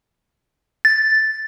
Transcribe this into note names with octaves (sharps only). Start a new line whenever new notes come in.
A6